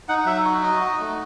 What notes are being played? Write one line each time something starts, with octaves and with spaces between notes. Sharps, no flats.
D#4 F#5
F#3 E5
F#4
D#4 D#5
F#4
A3